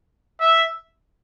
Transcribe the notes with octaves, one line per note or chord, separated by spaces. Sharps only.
E5